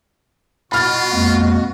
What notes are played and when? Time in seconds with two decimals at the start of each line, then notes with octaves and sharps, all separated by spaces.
0.72 B2 F4 F#4 B5 F6 A6
1.12 F2 G#3 A#3